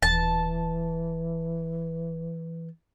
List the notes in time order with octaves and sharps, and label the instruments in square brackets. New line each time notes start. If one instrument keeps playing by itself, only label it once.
[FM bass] D#1 [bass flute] E3 [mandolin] A5